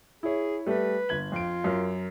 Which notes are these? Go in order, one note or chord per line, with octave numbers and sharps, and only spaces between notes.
E4 G#4 C#5
G3 A3 B4
G1 G#6 F#7
F2 F4 D7
F#2 A#4